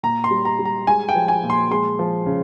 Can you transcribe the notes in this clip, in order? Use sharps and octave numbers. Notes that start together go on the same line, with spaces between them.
A#2 A#5
C6
G3
A#5
G3
A#5
G#3 G#5
G5
F3
G#5
A#2
C6
G#3 C6
F3
C#3